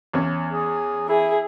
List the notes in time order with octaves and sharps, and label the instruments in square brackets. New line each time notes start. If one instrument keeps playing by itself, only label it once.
[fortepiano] E2 C#4
[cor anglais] G#4
[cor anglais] E4 [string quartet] G#4